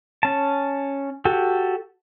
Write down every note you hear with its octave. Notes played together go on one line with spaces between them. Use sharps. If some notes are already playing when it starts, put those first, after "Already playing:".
C#4 A5
F#4 G4 A4